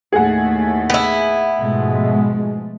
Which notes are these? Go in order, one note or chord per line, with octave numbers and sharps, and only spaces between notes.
D#2 A2 A3 G#4 F#5
B3 E4
G#2 B2 F3 G#3 A3